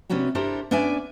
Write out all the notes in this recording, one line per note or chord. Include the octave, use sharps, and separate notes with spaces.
C3 B3 C#4 D4 F#4 G4
D4 E4 G4 A4 A#4 C5
B3 C#4 D4 D5 E5 G#5